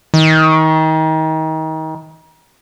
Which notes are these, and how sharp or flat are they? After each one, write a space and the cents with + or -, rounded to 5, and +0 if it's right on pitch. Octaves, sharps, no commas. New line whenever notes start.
D#3 +30